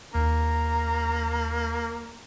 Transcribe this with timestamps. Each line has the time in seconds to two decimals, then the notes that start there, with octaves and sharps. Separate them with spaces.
0.15 D#2 A#3 A#5